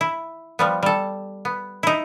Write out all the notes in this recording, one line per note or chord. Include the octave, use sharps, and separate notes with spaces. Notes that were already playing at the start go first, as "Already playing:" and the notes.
E4
F3 G3 B3
G3 A4
B3
D#4 E4